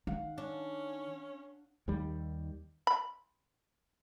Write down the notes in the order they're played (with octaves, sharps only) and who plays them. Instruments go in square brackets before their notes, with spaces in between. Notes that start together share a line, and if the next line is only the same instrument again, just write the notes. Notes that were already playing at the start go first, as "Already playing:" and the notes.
[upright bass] D#3 [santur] F5 F#5
[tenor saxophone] C#4 [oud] D4
[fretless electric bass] D#2 D#3 G3
[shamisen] B5